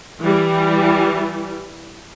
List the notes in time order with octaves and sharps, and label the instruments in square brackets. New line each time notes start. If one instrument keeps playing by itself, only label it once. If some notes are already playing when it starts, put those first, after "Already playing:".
[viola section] E3 G3